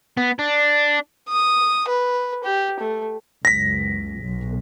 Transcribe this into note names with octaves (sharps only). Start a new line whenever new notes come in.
B3
D4
D#6
B4
G4
A3
F#1 C#2 A#6 B6
B1